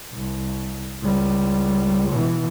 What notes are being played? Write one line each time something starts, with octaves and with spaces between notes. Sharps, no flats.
C2
C#2 G3
B2 E3